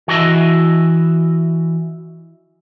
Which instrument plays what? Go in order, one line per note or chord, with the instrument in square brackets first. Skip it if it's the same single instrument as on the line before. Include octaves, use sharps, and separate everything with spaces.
[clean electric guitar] E3 F#4 D#5 E5